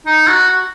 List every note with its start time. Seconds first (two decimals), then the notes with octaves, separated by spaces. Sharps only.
0.07 D#4
0.28 F#4